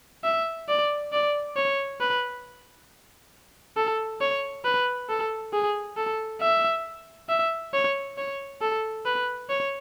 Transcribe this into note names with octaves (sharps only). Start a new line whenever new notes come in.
E5
D5
D5
C#5
B4
A4
C#5
B4
A4
G#4
A4
E5
E5
C#5
C#5
A4
B4
C#5